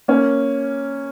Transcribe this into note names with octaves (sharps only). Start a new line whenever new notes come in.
A#3 C#4